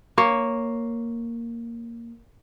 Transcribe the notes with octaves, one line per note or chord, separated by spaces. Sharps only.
A#3 C#5